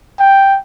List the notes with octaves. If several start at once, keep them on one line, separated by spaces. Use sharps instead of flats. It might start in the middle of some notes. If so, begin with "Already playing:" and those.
G5